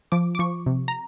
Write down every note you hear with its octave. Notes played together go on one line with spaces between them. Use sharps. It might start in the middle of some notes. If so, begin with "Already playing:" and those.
F3 D6
D6
F3 C#6
C3
A#5